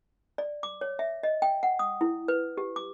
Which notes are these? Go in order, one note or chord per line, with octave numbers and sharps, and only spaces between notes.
D5
D6
C#5
E5
D#5
G5
F#5
D#6
E4
B4
G4
D6